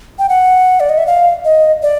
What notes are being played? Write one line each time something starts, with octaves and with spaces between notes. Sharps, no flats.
G5
F#5
D5
D#5
E5
F5
D#5
D5